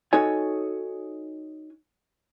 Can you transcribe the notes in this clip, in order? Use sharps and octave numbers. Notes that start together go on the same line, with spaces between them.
D#4 F#4 A4 C#5 G#5